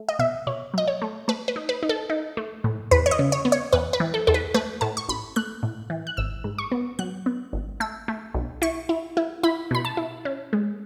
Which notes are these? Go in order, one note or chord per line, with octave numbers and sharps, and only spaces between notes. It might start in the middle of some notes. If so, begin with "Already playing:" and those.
Already playing: A3
D#5
B2 E5
B2 C#5
F#3 D#5
C#5
A3
A3 B4
B4
D#4
B4
D#4
A4
D#4
A3
A2
E2 B4
C#5
D#5
C#3
C#5
B3
C#5
E2 B4
B4
E3
A4
E2 A4
B4
A3 B4
A2 A5
C#6
A1 B5
A3 F#6
A2
E3
F#6
G#1 E6
G#2
C#6
B3
F#3 F#6
B3
G#1
A3 E6
A3
B1
E4 C#6
E4
E4
E4 B5
B2 B5
A5
E4
C#4
G#3